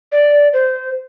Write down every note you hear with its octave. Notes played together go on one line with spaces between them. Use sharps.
D5
C5